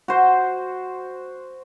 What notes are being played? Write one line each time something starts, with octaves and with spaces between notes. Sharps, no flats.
F#4 C5